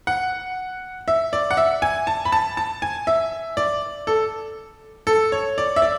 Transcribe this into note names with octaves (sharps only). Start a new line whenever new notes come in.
F#5
E5
D5
F#5
E5
G#5
A5
B5
A5
A5
G#5
E5
D5
A4
A4
C#5
D5
E5
D5